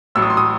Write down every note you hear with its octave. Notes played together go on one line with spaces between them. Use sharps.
A1 A2 F#3 E6
D#6
C6
D#6